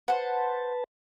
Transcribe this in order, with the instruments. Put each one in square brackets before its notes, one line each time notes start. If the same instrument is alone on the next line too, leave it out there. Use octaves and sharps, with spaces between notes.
[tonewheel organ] B4 A5 [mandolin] C5 F#5